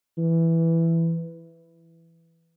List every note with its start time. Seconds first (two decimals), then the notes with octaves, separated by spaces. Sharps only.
0.18 E3